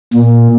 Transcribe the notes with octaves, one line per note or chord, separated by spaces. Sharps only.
A#2